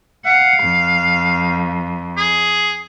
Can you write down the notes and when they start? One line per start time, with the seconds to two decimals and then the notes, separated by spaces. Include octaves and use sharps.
0.26 F5 F#5
0.64 F2
2.17 G#4